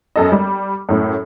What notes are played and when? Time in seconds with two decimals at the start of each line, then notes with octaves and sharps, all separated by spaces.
0.16 F#2 A4 D#5
0.32 G3
0.89 F#2 A2